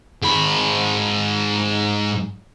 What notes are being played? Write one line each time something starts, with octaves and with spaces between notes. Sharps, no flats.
G#2 B5